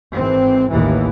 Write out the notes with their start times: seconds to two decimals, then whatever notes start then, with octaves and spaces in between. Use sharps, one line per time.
0.14 G#1 E3 C4
0.72 A1 D#2 A2 E3